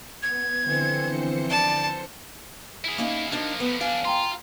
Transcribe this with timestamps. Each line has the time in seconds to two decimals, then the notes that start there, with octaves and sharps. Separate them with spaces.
0.23 B3 G#6
0.63 D3 E3 F3 C4 C5 C#7
1.50 D5 A5
2.85 E4 G#4
2.98 A#3 C#4 D#4
3.32 F3 A#3 D4 D#4
3.60 A2 F3 B3
3.81 B1 D4 F5 G#5
4.05 F4 G5 A#5 C6